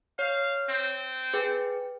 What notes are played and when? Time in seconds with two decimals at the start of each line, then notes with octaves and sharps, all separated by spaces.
0.19 C#5 F5
0.69 C4
1.34 G#4 B4 G5